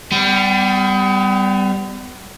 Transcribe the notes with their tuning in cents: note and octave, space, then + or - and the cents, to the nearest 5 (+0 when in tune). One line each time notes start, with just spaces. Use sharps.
G3 +0 B3 +40